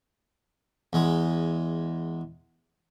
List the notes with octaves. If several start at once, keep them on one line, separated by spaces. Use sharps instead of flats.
E2 G#3